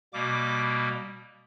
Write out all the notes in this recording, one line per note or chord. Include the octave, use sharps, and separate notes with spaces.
B2 G3 A#3 D6